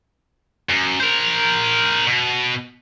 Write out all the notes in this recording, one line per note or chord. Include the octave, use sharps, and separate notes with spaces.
F#2
A#4 C5
B2